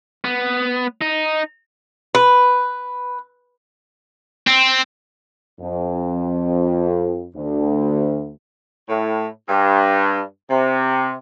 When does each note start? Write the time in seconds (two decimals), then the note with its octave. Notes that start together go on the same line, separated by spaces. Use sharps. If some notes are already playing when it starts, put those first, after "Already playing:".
0.24 B3
1.01 D#4
2.15 B4
4.47 C4
5.61 F2
7.36 D2
8.89 A2
9.49 G2
10.49 C3